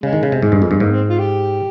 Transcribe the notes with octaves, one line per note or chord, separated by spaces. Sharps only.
C#3 G#3
D#3
C#3
C3
G#2 G#3
G2
F2
G2
G#2 A#3
C4
F4
G4